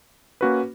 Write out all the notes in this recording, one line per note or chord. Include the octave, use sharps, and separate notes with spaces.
A#3 C#4 F#4 B4